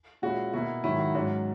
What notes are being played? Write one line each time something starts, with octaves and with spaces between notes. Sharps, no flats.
A#2 G#3 C#4 E4 F#4
B2 A#3 E4 F#4
G#2 D#3 F#3 E4
F#4
G#2 F#3 C#4 F#4